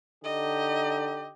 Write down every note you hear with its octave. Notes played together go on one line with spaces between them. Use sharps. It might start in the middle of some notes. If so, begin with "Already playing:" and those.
D3 D#4 G4 D#5